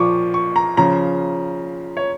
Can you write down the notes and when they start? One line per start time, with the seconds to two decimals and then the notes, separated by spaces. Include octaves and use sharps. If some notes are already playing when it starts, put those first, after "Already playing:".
Already playing: A#2 F3 C#6 D6
0.34 C#6
0.56 A#5
0.77 C#3 F3 A#5
1.97 C#5